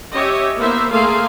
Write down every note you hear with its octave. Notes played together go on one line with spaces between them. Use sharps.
C#4 G4 C#5 D#5 E5
A#3 B3 E4 C5 E5
A3 A#3 G#4 F5 C6